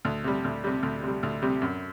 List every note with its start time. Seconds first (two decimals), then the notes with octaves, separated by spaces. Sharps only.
0.05 D2
0.24 C3 G3
0.44 D2
0.64 C3 G3
0.83 D2
1.03 C3 G3
1.23 D2
1.42 C3 G3
1.62 F#2